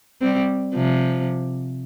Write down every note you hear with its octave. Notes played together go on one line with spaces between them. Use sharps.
G3 C4
C3 F3